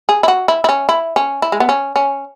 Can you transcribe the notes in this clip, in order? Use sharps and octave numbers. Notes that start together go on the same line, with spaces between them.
G#4
E4
F#4
E4
E4
C#4
E4
C#4
E4
G#3
B3
C#4
C#4